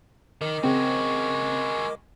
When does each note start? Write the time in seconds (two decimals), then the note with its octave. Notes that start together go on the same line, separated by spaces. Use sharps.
0.41 D#3 A#4 D#5 D6
0.64 C#3 G#3 C4 F#4